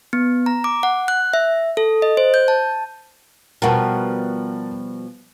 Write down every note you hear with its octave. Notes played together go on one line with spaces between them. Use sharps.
B3
A#5
D6
F#5
F#6
E5
A4
D#5
C5
G6
A5
B2 F3 G3 A#4 F#5 A5